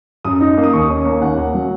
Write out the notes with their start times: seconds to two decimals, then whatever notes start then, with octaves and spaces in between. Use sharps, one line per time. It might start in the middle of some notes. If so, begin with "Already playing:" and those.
0.25 F#2 D#6
0.41 D#4
0.57 A#3
0.64 D#6
0.73 D#2 C#6
0.90 C#4
1.05 A#3
1.22 D#2 F#5
1.37 A#3
1.54 F#3